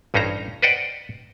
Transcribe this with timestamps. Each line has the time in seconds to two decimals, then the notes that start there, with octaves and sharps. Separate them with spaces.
0.14 A1 G2 C#4 D#4 C5 A#5
0.62 B4 C5 D5 D#5 F#5 G5